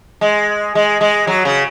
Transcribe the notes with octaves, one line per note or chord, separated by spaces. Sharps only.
G#3
G#3
G#3
F#3
C#3